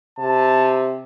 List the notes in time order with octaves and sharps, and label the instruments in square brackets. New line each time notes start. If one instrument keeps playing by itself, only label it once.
[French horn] C3 [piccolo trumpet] A5